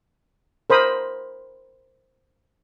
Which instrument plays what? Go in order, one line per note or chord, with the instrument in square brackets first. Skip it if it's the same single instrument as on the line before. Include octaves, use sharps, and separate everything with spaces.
[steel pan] A#4 C5 B5 D#6